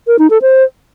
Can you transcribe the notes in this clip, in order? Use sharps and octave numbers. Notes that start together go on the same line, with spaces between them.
A#4
D#4
A4
C5